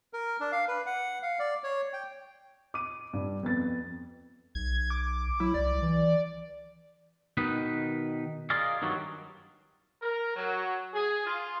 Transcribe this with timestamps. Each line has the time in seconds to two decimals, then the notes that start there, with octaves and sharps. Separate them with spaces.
0.13 A#4
0.40 D4
0.52 F5
0.68 B4
0.86 F#5
1.22 F5
1.39 D5
1.64 C#5
1.93 G5
2.74 D6 D#7
3.13 G2
3.43 F2 B3 A6
4.55 B1 G#6
4.90 D6
5.40 F#3 E4
5.54 C2 D5
5.82 E3
7.37 B2 D#3 D#4 B4
8.50 F4 G#4 A#4 D5 D#5 F5
8.82 G2 D#3 F#3 G3
10.02 A#4
10.36 F#3
10.94 G#4
11.26 F4